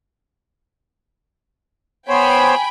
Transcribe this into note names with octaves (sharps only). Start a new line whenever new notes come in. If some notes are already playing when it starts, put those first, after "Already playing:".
B3 C5 C#5 G5 G#5 B5